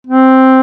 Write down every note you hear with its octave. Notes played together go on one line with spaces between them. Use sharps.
C4